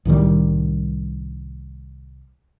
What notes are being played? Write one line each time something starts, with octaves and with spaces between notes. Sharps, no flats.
C2 A2 D#3 G3